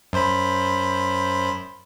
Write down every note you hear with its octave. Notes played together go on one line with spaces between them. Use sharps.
F#2 C5 B5